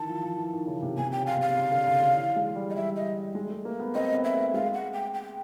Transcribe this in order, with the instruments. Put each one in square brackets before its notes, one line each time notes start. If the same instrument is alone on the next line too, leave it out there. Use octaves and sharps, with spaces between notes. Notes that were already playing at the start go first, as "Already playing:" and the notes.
Already playing: [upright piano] D#3 E3 [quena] A5
[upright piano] F3
F3
E3
D#3
C#3
C3
[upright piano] C3 [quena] G#5
[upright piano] C#3 [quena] G5
[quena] F5
[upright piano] C3 [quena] F5
[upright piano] C#3
D3
C#3
C#3
E3
G#3
G3
[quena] D#5
[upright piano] G3 [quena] E5
[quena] D#5
[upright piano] G#3
A3
A#3
B3
[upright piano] C4 [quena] D#5
[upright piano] B3
[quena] E5
[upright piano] A3
[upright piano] G#3 [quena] F5
[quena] F#5
G5
G5